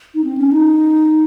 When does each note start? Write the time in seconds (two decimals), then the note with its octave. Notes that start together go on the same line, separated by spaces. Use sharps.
0.15 D#4
0.24 C4
0.38 C#4
0.52 D#4